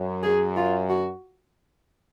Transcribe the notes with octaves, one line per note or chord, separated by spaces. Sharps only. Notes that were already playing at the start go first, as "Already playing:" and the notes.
Already playing: F#2
G#4
F4
F#4